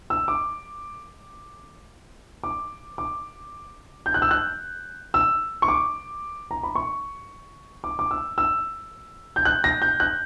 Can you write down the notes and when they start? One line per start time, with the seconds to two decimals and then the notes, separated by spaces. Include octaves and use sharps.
0.10 E6
0.28 D6
2.44 D6
2.98 D6
4.06 G6
4.14 F#6
4.22 E6
4.31 F#6
5.14 E6
5.62 C#6
5.68 D6
6.51 A#5
6.63 B5
6.75 C#6
7.84 D6
7.99 D6
8.11 E6
8.38 E6
9.36 G6
9.45 F#6
9.64 A#6
9.82 G6
10.00 F#6